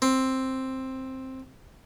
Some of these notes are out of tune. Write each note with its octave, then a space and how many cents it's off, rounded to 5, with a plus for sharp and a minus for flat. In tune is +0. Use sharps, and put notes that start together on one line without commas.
C4 +5